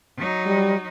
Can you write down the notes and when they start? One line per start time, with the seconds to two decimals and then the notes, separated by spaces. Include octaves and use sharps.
0.17 F#3 D#4
0.46 G3